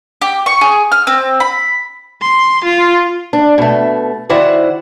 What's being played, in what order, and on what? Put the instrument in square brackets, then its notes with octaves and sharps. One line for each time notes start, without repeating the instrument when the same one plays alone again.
[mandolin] G4
C#6
G#4
F6
C4
B5
[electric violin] C6
F4
[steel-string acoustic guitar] D4
B2 A3
D#3 E4 F#4 C5 D5